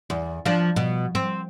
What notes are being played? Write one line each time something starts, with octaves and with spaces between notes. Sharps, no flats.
E2
F3 D4
B2
C4